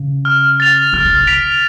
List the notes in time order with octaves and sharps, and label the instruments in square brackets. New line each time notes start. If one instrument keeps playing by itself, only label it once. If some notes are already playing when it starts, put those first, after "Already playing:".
Already playing: [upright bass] C#3
[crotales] F6
A6 F7
[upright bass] D3 [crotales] F6
[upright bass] C#3
D3
[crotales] B6 D7 F7